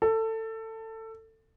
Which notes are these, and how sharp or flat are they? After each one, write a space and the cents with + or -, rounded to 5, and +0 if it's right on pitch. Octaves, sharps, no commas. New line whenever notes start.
A4 +20